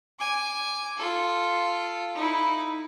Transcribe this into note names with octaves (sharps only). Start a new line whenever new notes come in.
G#5 D6
F4 A4
D#4 E4